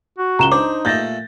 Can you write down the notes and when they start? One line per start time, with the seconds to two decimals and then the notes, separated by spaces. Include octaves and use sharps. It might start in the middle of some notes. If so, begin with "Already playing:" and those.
0.18 F#4
0.39 C#2 A#5 E7 G7
0.52 D4 D#4 C5 D6
0.85 A#2 A3 G6 A6 A#6